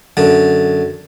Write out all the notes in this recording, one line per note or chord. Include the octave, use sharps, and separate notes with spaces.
F#2 D3